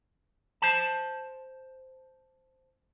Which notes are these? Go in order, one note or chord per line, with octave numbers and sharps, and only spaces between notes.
C5 A5